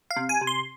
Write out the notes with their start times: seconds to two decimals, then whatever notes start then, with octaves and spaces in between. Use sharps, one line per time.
0.11 F5
0.16 C3
0.29 G#5
0.41 C3
0.47 C6